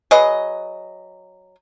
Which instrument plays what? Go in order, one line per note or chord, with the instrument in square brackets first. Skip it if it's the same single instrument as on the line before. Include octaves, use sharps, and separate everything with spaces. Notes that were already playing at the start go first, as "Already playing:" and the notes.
[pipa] F#3 G#4 B4 D#5